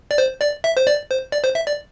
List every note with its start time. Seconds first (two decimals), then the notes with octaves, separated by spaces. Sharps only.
0.11 D5
0.18 C5
0.41 D5
0.64 E5
0.77 C5
0.87 D5
1.10 C5
1.32 D5
1.44 C5
1.55 E5
1.67 D5